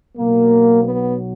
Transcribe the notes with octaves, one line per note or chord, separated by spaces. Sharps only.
B1 B2 F#3 A#3
B3